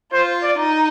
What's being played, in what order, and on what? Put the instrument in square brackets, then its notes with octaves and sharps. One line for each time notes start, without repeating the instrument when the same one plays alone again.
[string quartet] F4 [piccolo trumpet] C5
[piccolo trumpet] D5
[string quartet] D#4